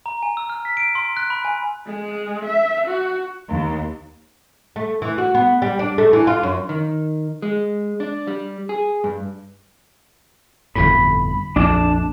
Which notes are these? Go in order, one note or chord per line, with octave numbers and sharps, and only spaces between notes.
A#5
G#5
E6
F6
B6
D7
C6
F#6
B5
G#5
G#3
E5
F#4
D#2
A3
E3
F#4
B3
G3
D4
A3
E3
F4
F#2
D#3
G#3
D4
G3
G#4
G2
G1 F2 A2 B5
A#1 F2 D4 A5